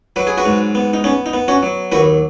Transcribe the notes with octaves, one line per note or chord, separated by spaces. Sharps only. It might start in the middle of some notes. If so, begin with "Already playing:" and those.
F#3 B4
G#4
F#4 B4
G#2
B3
D#4
B3 C#4
D#4
B3
C#4 F#4
F#3
D#2 F#4 B4